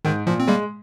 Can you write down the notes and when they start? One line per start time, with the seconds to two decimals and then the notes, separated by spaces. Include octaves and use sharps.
0.05 G#2 D#3
0.27 A#2 F3
0.40 C4
0.47 G3 G#3 A#3